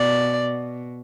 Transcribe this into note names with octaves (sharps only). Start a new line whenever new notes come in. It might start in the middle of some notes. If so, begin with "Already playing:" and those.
Already playing: B2 D5